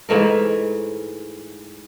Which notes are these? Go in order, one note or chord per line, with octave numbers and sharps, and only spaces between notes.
G#2 E3 A3 A#4